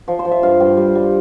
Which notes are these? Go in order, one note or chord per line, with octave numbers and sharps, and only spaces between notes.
F3
C5
F3
E5
G2 F5
G2 G5
G3
G3